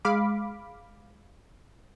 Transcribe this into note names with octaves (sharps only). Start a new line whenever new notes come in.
G#3 F5 B5 D6